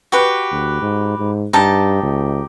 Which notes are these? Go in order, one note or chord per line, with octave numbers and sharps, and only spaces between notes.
F#4 G4 B4
D2
G#2
G#2
G2 D#4 G4 A5
C#2